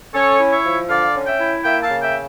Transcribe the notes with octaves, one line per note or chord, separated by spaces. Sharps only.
C#4 A4 C#5
E4
C#5 E5
F3
D3 D5 F5
C#4
E5 G5
E4
A#3 E5 G5
F5 A5
C#3
E5 G5